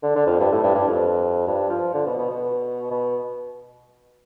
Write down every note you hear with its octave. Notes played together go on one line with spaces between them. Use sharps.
D3
D3
F2
G2
A2
G2
G2
F2
G2
F3
D3
B2
B2
B2
B2